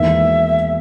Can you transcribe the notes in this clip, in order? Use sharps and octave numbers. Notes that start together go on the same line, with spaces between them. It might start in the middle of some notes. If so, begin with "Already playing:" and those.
Already playing: E1 E2 D#3 A#3 E5